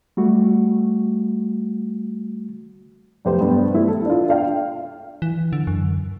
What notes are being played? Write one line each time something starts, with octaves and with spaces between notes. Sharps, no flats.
G3 A3 F#4
F1 G4 C5
G2 B3
A3 E4
A4
D4 F4
D4 F5 G5
E3
D3
F#2